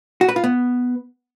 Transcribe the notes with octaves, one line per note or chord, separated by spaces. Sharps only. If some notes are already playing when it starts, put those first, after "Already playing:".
F#4
B4
F4
B3